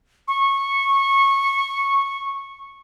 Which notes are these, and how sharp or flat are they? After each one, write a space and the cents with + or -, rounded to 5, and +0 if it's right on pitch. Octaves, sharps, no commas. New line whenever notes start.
C#6 -15